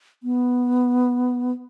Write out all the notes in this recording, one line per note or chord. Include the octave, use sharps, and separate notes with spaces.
B3